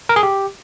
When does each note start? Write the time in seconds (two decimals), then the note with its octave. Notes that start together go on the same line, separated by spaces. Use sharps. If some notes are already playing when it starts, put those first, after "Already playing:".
0.09 A#4
0.16 G#4
0.23 G4